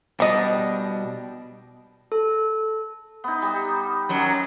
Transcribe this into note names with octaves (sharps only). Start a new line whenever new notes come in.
B2 G3 D4 D#5
A4
B3 D#4
G3
F#2 F#3